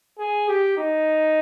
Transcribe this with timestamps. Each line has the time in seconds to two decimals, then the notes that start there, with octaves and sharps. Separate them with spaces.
0.19 G#4
0.49 G4
0.78 D#4